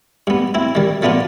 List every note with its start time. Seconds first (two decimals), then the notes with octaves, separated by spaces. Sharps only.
0.27 G2 B3
0.54 C4 E4
0.75 D#3 G3
1.02 F3 A3 B3 D4 F4